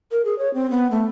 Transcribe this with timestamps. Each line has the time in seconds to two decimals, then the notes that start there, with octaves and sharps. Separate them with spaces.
0.12 A#4
0.25 G#4
0.39 C#5
0.54 C4
0.71 B3
0.91 A3